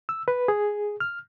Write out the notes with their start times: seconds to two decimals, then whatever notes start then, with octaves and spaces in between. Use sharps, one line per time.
0.09 E6
0.28 B4
0.48 G#4
1.00 F6